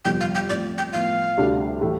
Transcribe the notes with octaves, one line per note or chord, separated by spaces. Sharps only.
G1 F2 C3 F3 G5
F5
G5
A1 A2 F3 C4 D5
G5
A2 F3 B3 F5
D2 C3 G3 D4 A4
A2 E3 A3 E4 G4